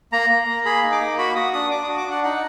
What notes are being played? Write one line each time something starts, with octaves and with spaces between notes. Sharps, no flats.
A#3 A#5
A#3
A#3
G#4 B5
D#4
D6
A#3
F#4 B5
F#4 D#6
D4 D#6
D4 D6
F#4 D#6
D6
D4 F#5
D#4 F#5